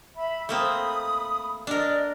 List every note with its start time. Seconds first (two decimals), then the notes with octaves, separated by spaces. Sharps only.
0.16 E5 B5
0.49 A3 A#3 C4 B5 D#6
1.67 D4 A#4 D5 D#5